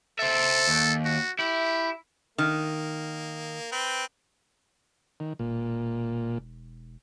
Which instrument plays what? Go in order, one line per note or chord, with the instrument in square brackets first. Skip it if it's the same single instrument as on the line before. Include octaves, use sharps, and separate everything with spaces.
[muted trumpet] A4 [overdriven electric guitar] C5 E5
[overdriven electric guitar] D#2
[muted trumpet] F#4
[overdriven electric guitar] E4 [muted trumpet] G4
[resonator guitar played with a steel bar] D#3 [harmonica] A#3
[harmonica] C4 B4 G5
[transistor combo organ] D#3
[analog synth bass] E1 [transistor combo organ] A#2